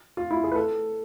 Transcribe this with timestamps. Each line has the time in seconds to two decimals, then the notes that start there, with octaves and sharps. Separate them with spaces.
0.17 F4
0.31 E4
0.37 F4
0.44 G#4
0.52 B4
0.56 A4